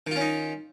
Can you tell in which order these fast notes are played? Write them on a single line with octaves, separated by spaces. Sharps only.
D#3 F4 C#4 D#4